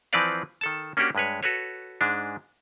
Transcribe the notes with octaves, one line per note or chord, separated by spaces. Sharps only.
E3 F3 C4 B4 D5 F5
D#3 A4 A5
A#3 C#4 D4 F#4 G4 F#5
G2 G#3 B4 C#5
F#4 A4 B4 C#5
G#2 G#3 D4